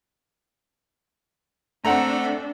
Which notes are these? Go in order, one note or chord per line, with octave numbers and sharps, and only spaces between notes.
A3 C4 D4 A4 F#5 A#5